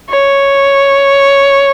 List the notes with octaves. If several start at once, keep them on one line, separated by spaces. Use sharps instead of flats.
C#5